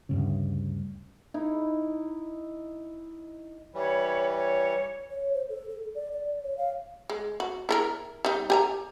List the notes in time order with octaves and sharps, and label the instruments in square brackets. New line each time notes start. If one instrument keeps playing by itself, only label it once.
[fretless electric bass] D2 G2 C#3
[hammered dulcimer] D#4 E4
[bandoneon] E3 G3 [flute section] C#5 B5
[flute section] C#5
[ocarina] C#5
C5
A4
A4
D5
D5
C#5
F5
[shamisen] G#3
F#4
E4 A4 A#4
G3 D#4
G4 G#5 A#5